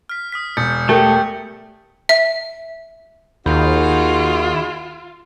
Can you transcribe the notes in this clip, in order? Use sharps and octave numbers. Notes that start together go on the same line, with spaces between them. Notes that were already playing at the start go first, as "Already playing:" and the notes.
F6 B6
D#6 F6 B6
E1 G6 A6 C#7
A3 G4 A#4
E5
D#2 D#3 D#4 F4 F#4 G#4 B5 G6